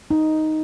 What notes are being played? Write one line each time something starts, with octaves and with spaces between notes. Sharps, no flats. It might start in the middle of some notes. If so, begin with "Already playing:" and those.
D#4